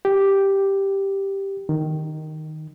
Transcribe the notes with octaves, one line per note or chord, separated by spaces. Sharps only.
G4
D#3